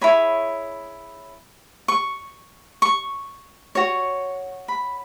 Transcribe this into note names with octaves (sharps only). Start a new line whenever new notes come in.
E4 G#4 C#5 B5
C#6
C#6
F#4 C#5
B5